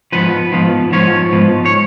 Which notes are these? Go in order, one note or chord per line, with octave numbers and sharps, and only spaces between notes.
G#2 F3 B3 B4
G#2 F3 B3
G#2 F3 B3 C#5
G#2 F3 B3
C#5